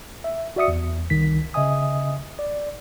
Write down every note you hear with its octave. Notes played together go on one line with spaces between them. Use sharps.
E5
F#4 D5 E5 D#6 C#7
E2
C2 D#3 B6
C#3 D#5 E5 G#5 D#6
D5